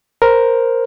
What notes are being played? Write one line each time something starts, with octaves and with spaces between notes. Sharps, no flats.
A#4 C5